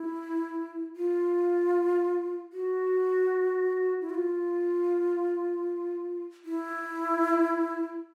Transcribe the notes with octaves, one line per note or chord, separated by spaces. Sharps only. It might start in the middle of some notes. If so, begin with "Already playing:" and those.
Already playing: E4
F4
F#4
E4
F#4
F4
E4